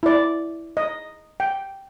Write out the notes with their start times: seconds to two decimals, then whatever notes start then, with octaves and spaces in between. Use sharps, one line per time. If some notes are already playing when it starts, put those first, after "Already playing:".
0.03 E4 D5
0.77 D#5
1.40 G5